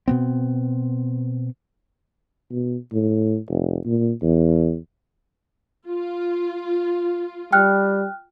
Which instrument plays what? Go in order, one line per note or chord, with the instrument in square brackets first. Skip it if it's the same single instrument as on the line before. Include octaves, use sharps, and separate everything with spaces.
[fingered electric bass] B2 B3 C4
[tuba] B2
A2
F1
A#2
E2
[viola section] F4
[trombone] G3 [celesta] G5 F6 F#6